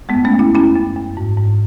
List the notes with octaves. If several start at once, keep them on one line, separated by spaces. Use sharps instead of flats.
G#3 B3
F#2
A3 C#4
F#2 C#4 E4
F#2 C#4 E4
F#2
F#2
G#2
G#2